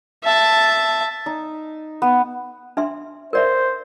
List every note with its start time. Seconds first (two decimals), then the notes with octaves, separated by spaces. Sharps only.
0.24 E5 A5
1.26 D#4
2.02 B3
2.77 D4 E5 C6
3.33 A#4 C5 D5 E5